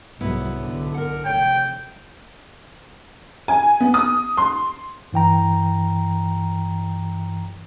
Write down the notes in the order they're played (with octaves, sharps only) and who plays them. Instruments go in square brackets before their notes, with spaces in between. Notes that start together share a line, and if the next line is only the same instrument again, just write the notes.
[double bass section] C2 G#2 F#3 [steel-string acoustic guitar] B3 E4 B4
[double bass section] B1 D3
[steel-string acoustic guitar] A#4 F#5
[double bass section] F1 [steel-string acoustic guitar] C#5 [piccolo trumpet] G5
[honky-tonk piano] G#5
B3
D#6
C6
[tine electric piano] G2 E3 G5 A#5